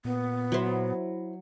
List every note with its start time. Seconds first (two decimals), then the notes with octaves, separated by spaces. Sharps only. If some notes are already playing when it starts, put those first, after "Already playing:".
0.05 A#2 B3
0.52 F#3 E4 C5